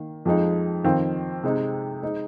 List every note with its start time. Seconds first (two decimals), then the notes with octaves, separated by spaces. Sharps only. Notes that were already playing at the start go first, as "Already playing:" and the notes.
Already playing: D#3 A#3
0.25 F2 F3 G#3 D#4
0.84 F2 D#3 C4 F4
1.44 C3 G#3 D#4
2.03 G#3 D#4